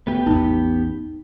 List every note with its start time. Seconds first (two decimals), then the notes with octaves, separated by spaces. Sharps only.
0.07 D2 A3 B3 G4
0.26 A1 E2 D#4